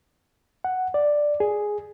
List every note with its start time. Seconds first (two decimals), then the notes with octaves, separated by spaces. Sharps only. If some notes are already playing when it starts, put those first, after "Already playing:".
0.64 F#5
0.94 D5
1.40 G#4